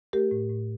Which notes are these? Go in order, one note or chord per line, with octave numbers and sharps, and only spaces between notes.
A3 G4 A#4
A2
A2